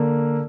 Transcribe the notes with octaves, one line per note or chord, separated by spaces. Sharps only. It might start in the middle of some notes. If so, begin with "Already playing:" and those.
Already playing: D3 A#3